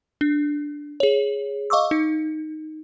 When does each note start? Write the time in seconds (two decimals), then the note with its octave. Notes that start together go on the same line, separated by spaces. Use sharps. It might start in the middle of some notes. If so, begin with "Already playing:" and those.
0.21 D4
1.00 G#4 C#5
1.70 D#5 F5 C#6 D6 E6
1.91 D#4